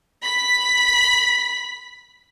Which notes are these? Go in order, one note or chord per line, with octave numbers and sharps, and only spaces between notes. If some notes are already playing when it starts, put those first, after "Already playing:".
B5 B6